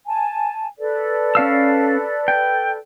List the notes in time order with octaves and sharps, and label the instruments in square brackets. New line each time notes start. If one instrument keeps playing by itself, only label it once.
[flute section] G#5 A5
A4 B4 D5
[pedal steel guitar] C#4 F5 E6
G5